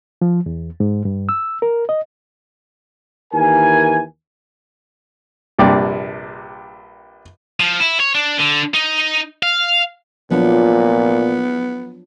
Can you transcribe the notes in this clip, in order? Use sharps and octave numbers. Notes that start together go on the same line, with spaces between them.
F3
E2
G#2
G2
E6
A#4
D#5
D#2 E3 A#4 G#5
A#1 G2 C3 D5
F3
E4
C#5
D4
D3
D#4
F5
A#2 F3 F#3 B3 D4